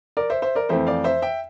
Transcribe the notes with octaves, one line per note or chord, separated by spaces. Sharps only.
A#4 D5
C5 E5
C5 E5
A#4 D5
F2 E3 A3 C4 C5 E5
D5 F5
C5 E5
E5 G5